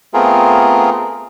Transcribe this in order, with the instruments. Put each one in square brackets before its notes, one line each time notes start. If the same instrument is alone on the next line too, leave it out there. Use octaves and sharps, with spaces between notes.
[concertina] A3 B3 C4 F4 G#4 A#4